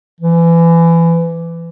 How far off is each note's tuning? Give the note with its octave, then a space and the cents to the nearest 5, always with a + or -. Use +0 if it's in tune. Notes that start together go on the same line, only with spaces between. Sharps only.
E3 +25